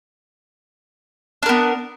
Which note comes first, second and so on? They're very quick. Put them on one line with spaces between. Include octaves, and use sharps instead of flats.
D4 A#4 B3